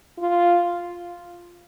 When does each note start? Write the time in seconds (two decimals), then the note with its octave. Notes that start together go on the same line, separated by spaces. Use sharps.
0.19 F4